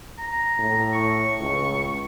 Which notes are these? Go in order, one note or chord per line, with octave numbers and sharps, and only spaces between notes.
A#5
A2
C#6
C#2